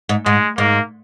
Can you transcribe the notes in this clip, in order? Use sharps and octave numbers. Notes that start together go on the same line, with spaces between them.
G#2
G#2 G#3
G#2 A#3